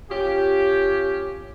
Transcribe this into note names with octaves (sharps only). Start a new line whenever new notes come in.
C#4 F4 G4